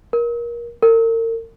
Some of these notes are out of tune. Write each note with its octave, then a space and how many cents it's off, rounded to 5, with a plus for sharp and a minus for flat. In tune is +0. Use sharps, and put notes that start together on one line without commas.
A#4 +25
A#4 -40